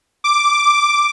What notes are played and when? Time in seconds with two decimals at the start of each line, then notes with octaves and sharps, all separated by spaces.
0.24 D6